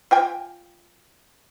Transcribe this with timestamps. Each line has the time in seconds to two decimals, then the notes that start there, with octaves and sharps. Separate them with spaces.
0.11 F4 G5 G#5